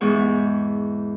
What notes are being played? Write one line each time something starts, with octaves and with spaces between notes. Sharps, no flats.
E2 G#2 C#6